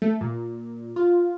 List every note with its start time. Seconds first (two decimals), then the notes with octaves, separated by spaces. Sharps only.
0.02 A3
0.21 A#2
0.96 F4